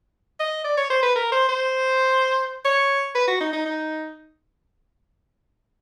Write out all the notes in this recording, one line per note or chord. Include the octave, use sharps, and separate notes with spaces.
D#5
D5
C#5
C5
B4
A#4
C5
C5
C#5
B4
F#4
D#4
D#4
D#4